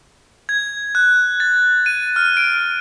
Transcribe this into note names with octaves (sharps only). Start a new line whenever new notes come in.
G#6
F#6
A6
D#7
F6
D7